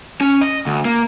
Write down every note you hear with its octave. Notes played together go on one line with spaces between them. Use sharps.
C#4
D#5
D2
A#3